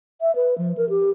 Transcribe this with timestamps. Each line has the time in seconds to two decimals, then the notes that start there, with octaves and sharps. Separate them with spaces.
0.21 E5
0.35 B4
0.58 F3
0.77 A#4
0.89 G4